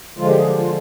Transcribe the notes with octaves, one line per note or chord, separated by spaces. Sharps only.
D3 F3 G#3 F4
G4
G#4
G4
F4